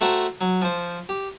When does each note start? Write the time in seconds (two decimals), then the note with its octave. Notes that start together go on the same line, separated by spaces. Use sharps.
0.01 A3 F#4 C5 G5 A5 A#5
0.41 F#3
0.62 F3 C5
1.09 G4